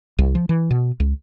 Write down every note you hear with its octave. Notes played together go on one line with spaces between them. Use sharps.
C2
F3
E3
B2
C#2